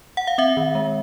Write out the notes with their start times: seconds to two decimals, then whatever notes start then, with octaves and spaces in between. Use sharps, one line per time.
0.17 F#5
0.27 F5
0.38 C4 E5
0.57 D#3
0.75 G#3